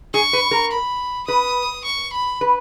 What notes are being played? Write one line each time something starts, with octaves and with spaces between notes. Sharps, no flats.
G#4 C#6
B4
A#4
B5
B4 D#6
C#6
B5
B4